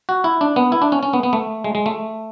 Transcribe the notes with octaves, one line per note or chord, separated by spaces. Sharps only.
F#4
E4
D4
B3
E4
D4
C#4
C#4
B3
B3
A3
G#3
G#3
A3